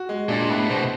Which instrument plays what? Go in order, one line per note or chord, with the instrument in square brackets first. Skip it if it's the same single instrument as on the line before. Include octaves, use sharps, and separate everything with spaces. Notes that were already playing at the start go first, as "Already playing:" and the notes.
Already playing: [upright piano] F#4
G#3
[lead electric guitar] A#2 [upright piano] D4
[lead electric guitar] A2 [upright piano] B3
[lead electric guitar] B2 [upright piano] C5